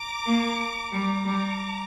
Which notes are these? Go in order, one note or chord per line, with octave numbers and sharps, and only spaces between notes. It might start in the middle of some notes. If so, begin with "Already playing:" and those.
Already playing: A#5 D6
A#3
G3 A#5 D6
G3